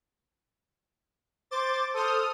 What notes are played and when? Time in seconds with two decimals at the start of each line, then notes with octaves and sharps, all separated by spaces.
1.51 C5 D6 A6
1.94 A4 C5 D#6 F6